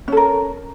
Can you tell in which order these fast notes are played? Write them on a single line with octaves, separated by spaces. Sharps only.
C#4 A4 A#4